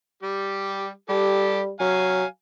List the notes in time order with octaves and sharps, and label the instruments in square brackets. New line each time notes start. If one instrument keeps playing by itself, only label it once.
[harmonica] G3 G4
[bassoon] G3 [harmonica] G4 A4
[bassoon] F#3 [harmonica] F5 G#5